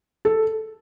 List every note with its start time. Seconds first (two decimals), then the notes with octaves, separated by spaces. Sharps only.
0.25 A4